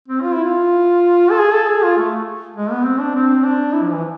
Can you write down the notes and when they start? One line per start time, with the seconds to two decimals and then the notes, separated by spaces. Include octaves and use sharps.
0.08 C4
0.22 F4
0.33 E4
0.44 F4
1.31 A4
1.39 G#4
1.53 A4
1.69 G#4
1.83 F4
1.98 A3
2.56 G#3
2.71 B3
2.85 C4
2.99 D4
3.15 C4
3.43 D4
3.73 E4
3.82 F3
3.92 E3